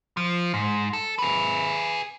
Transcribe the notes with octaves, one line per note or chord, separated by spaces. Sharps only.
F3
G#2
A4
G#4 B4